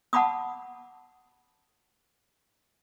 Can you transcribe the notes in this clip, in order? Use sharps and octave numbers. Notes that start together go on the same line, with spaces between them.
F#5 A5 B5 D6 D#6